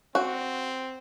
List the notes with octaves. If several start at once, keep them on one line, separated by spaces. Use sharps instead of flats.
C4 F#4